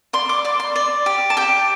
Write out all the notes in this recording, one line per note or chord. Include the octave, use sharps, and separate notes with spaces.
D5 C6
D6
D5 D6
C6
D5
G4
A5
G4 G5